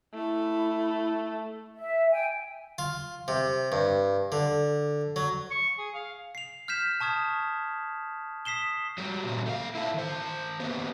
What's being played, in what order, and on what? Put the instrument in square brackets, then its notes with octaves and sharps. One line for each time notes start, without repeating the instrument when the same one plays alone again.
[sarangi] A3 [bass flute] E4
[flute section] E5
G5 G#5
[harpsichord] F4
C3
G2
D3
F#3
[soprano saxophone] C#6
G#4
F5
[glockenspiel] C7 F7
F6 G6 B6 E7
A5 C#6 D#6 G#6
D#6 B6 C7 E7 G7
[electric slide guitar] F#3 G3
A#2 C#3 F#3
A3 F5
E4 F4 A4 C5 E5
D#3 C5
A#3 B3 C#4 G4